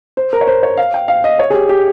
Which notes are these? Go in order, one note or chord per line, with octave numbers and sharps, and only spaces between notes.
C5
A#4
C#5
C5
C#5
F5
G5
F5
D#5
C#5
G#4
G4
G4